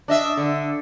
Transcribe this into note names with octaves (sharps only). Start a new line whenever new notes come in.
D4 D#5 E5
D3